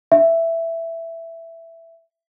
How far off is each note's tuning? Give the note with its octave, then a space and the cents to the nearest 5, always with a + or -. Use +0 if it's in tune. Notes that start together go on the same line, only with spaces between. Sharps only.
E5 +10